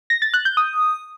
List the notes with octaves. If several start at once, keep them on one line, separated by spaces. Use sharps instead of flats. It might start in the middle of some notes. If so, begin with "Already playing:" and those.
A#6
A6
F#6
G6
D#6